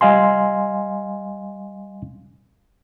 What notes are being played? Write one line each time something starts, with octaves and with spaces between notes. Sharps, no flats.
G3 D#5 F5 G#5 C6